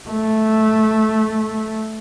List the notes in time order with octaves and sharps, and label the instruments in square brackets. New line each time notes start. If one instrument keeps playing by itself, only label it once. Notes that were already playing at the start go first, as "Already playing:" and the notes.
[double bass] A3